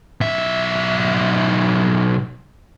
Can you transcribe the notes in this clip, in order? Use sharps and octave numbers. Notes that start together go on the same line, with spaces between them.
B1 E5